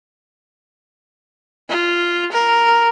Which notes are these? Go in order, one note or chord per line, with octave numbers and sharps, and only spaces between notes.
F4
A#4